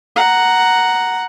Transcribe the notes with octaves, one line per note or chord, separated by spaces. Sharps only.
F#5 A#5